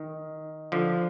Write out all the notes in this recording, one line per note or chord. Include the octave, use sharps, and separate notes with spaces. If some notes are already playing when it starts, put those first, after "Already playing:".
Already playing: D#3
D3 F3